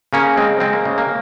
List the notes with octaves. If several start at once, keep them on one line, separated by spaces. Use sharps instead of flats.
C#3 A#3 C#4
G#3 C4
G#3 C4
A#3
C#3
A#3